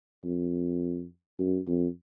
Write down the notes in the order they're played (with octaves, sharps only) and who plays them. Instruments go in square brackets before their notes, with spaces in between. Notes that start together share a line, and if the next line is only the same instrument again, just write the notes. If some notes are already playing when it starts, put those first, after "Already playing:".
[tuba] F2
F#2
F2